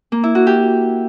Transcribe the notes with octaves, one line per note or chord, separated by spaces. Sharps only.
A#3
E4
F#4
G4